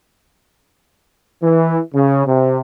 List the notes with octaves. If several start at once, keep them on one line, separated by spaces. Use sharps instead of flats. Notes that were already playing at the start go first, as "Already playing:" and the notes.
E3
C#3
C3